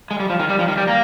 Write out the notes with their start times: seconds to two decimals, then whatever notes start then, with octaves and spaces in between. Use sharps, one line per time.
0.11 G#3
0.20 G3
0.30 F3
0.40 D#3
0.50 G3
0.59 F3
0.68 D#3
0.78 G3
0.88 A#3